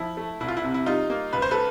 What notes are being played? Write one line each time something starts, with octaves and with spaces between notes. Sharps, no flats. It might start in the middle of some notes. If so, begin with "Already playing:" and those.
Already playing: F3 E4
A3
C2 E4
F4
E4
C3
E4
G3 D#4 F4
A#3
C#2 B4
C5
A4 B4